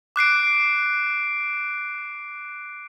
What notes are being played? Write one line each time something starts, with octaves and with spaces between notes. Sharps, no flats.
D6 F#6 C7 D7